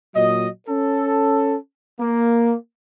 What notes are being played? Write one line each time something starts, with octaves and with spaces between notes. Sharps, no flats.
A#2 F#3 D#5
C#4 A4
A#3